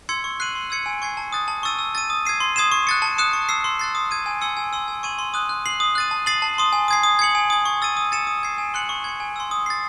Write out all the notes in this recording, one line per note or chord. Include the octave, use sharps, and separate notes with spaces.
C6 E6 G#6 C#7
C#6
F#6 C7 D#7 F#7
C6
E6 G#6 C#7
G#5
C#6 G#6 C7
A5
D#6 F#6 A6
A5
C#6 E6 A6 D#7
E6
A6 D#7
D#6
G#6 C7 D#7
C6
D#6 G#6 C7 E7
C#6
F#6 A6 C#7
A5
D#6 F#6 C#7 E7
C#6
E6 C7
C6
F#6 A6 C7
D#6
G#6 D#7
G#5
C6 E6 G#6 C#7
G#5
C6 E6
G#5
C#6 G#6 D#7 F#7
C6
D#6 F#6
F#6
C7 F#7
D#6
F#6 A6 D#7
A5
D#6 A6 C7 F#7
A5
C6 D#6
G#5
D#6 G#6 C7
D#6
G#6 C#7 F#7
G#5
D#6 G#6
C#6
E6 A6 D#7
D#6
A6 C#7 E7
D#6
G#6 C7
G#5
C6 F#6 C#7 F#7
C#6
G#6 C#7
G#5
C6 E6
D#6
A6 C7